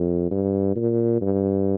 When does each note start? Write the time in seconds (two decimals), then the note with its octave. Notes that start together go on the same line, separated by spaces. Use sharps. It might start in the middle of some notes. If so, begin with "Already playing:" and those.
Already playing: F2
0.31 G2
0.76 A#2
1.21 G2